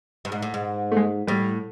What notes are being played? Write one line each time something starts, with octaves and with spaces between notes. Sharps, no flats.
G2
G#2
A2
G#2
A3
G#3
A2 G3